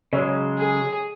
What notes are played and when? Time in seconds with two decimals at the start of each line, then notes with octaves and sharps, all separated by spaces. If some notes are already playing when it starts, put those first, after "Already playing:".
0.13 C#3 F#3 G#3 C#5
0.58 G#4